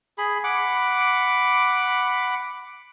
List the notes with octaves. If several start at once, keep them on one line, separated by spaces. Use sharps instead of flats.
G#4 B5
F#5 B5 D6